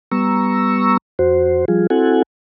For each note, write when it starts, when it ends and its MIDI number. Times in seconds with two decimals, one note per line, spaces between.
0.11 0.97 55
0.11 0.97 59
0.11 0.97 82
0.11 0.97 85
0.11 0.97 88
1.19 1.65 41
1.19 1.65 66
1.19 1.65 72
1.68 1.87 53
1.68 1.87 55
1.68 1.87 65
1.68 1.87 68
1.90 2.22 60
1.90 2.22 64
1.90 2.22 66
1.90 2.22 69
1.90 2.22 78
1.90 2.22 80